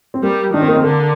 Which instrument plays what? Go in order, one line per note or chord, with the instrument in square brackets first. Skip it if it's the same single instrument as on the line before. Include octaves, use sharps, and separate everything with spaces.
[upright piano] C4
[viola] G3 [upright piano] A#3
[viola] D#3 [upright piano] D4
[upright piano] C4
A#3
C4
[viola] D3 [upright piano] A#3